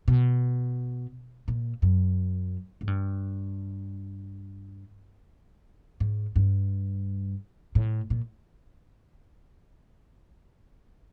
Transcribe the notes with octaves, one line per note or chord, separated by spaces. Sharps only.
B2
A#2
F#2
G#2
G2
G#2
G2
A2
A#2